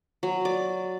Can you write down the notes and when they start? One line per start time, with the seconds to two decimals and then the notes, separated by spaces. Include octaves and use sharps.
0.23 F#3
0.45 D5